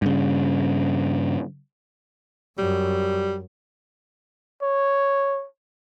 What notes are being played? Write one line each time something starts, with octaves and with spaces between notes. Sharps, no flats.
G2 C#3
F#2 G3
C#5